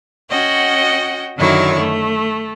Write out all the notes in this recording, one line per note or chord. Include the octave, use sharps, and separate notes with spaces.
C#4 F#4 D#5 F#5 G5
F#2 D3 D#3 F#3 E4 C#5
A3